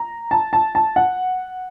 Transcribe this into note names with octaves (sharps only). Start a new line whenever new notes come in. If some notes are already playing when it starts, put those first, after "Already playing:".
Already playing: A#5
A5
A5
A5
F#5